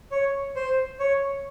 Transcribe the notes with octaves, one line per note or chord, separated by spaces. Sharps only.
C#5
C5
C#5